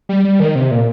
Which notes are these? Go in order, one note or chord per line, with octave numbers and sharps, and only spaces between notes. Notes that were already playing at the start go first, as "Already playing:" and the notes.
G3
G3
D#3
C3
A#2